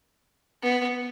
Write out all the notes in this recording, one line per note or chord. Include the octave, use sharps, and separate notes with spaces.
B3